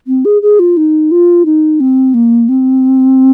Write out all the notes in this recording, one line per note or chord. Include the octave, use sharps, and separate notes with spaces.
C4
G#4
G#4
F4
D#4
F4
D#4
C4
A#3
C4